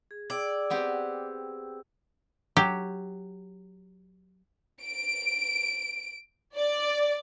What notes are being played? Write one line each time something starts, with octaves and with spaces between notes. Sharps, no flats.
G#4
G#4 D5 G5 E6
B3 C4 G4
F#3 G4
D7
D5